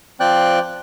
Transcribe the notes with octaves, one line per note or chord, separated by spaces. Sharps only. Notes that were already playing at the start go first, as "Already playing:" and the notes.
F3 C4 D5 G5 F#6